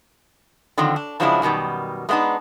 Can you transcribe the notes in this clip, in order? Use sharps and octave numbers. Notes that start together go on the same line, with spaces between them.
D3 D#3 F3 F#3 C4
D4
C#3 F3 F#3 G#3 D4 E4
F#2 B2 D#3 G3
G#3 A3 B3 D4 D#4